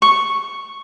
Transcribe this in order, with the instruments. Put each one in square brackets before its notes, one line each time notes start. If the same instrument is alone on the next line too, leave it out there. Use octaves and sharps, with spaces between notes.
[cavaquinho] C#6